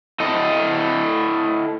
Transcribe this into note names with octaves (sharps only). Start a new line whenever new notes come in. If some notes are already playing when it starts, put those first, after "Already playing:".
E4 A4 D#5